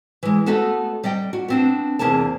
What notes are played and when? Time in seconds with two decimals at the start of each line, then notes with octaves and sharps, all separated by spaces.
0.23 E3 G#3
0.46 A3 B3 F#4 A4 B4 D#5
1.04 G3 D5 D#5 G5
1.33 F#4
1.48 B3 C4 D4
1.99 E2 C3 A#3 G#4 A5